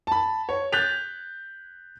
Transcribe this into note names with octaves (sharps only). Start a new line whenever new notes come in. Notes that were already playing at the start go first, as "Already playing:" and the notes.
A5 B5
C#5
F#6 G6 A6 B6 F7